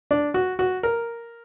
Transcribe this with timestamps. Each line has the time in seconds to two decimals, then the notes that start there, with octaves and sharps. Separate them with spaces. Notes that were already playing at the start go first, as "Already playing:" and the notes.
0.11 D4
0.34 F#4
0.59 F#4
0.83 A#4